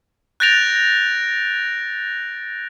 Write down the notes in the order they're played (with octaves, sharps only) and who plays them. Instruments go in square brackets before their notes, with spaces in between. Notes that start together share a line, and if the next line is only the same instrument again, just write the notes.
[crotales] F#6 G6 A6 A#6 D7 F7